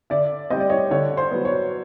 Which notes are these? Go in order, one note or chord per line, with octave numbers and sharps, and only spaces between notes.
D3 D5 E5
G3 C4 D#5
D5
C#5 D#5
D3 C#5
C5
F#3 B3
C#5